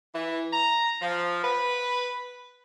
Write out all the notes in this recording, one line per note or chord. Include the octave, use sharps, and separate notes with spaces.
E3
A#5
F3
B4